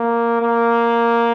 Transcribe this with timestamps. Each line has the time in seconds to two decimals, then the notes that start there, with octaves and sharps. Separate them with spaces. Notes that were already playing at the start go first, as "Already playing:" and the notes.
Already playing: A#3
0.42 A#3